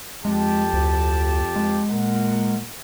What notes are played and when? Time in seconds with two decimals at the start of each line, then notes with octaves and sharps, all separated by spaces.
0.25 F2 G#3 G4 A5
0.73 D2
1.56 G#3
1.90 A#2 A#4 F#5